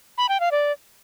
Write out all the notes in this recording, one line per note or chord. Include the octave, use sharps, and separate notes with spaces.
B5
G5
F5
D5